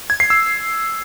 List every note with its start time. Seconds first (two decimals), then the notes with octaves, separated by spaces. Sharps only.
0.10 G#6
0.20 C7
0.30 E6